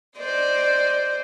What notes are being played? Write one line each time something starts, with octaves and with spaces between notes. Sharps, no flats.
C5 D5 D#5